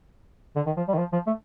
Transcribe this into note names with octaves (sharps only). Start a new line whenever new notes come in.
D3
D#3
F3
G3
D#3
F3
F3
A3